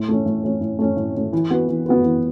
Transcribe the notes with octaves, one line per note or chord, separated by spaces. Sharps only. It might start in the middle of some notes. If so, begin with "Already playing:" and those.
Already playing: A2
A3 C#4
A2
A3 C#4
A2
A3 C#4
A2
A3 C#4
E3
B3 F#4 B4
E3
B3 F#4 B4
E3